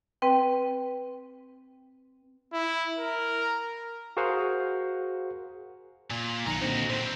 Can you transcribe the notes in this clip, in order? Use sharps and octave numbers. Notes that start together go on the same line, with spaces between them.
C4 B4 G5
E4
A#4
F#4 G#4 A#4 C5 F5 F#5
A#2
B1 D#3 A#4 F#5 A#5
A#2 D3 C4 D#4 F#4
A#2 C4 C5